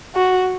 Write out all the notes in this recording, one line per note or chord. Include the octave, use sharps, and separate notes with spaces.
F#4